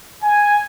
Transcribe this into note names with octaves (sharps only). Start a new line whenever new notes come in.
G#5